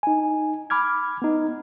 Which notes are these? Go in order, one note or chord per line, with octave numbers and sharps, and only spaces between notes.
D#4 G#5
B5 D6 F6 G#6
B3 D#4